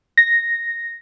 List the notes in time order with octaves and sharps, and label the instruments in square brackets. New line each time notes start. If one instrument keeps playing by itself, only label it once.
[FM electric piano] A#6